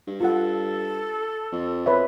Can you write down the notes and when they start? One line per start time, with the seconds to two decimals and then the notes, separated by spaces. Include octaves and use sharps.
0.07 G2
0.21 F4 A4 F#5
1.52 F2
1.86 B4 C#5 E5